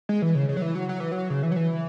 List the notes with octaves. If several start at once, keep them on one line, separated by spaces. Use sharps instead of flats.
G#3
E3
C#3
C#3
F#3
E3
F#3
F#3
E3
F#3
C#3
E3
F#3
E3